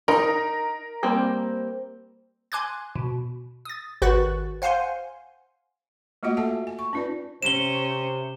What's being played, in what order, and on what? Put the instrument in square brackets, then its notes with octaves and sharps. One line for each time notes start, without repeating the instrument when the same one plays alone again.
[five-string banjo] D#4 [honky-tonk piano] A#4
[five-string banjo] G3 A#3 C4
[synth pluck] G#5 C6 D6 F#6 G#6
B2
D#6 A6
G#1 F#4 B4 F#5 F#6 A6
C5 F5 F#5 G#5 C6
[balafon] A3 A#3 F4 F#4 D#5 F#5
A4 E5 F#5 G#5 A5
G#5
C#6
C#4 D#4 F4 B4 D5
[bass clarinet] C3 [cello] C#4 [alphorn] C5 [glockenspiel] E7 G7